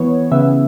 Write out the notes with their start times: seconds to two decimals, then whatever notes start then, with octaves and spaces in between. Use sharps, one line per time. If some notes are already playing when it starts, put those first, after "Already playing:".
Already playing: E3 B3 C#5
0.31 C#3 E3 B3 E5